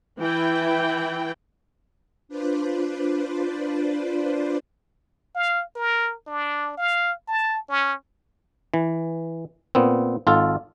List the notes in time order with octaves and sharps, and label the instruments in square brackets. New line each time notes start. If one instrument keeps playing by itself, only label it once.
[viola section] E3 E4 G5
[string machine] D4 F4 B4 C5 D5
[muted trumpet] F5
A#4
D4
F5
A5
C#4
[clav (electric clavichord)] E3
A#2 B3 C4
G#1 F4 A4